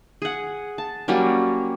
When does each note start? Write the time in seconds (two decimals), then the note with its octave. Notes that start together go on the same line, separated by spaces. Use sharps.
0.22 G#4 F#5
0.78 A5
1.08 F#3 G3 A#3 C#4